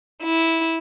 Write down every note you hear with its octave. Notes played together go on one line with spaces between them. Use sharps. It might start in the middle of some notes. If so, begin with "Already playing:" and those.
E4